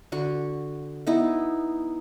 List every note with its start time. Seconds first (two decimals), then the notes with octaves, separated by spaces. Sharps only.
0.12 D3 F#4 C#6
1.07 B3 D#4 E4